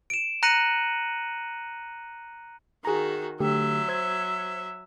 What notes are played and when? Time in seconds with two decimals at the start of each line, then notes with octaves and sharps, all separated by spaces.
0.10 D7 E7
0.43 A#5 F#6 A#6 C#7 D#7 F#7
2.85 D#3 F#4 G#4 A#5
3.40 D3 F#3 A3 G4 E5
3.88 C5 E6 G#6